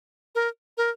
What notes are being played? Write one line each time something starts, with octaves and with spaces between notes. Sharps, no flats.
A#4
A#4